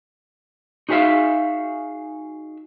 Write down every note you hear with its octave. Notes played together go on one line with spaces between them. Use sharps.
D#4 F#4 G#4 B4 E5 F5